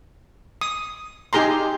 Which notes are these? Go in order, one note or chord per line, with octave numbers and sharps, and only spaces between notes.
D#6
D#4 G4 G#4 A#5 C6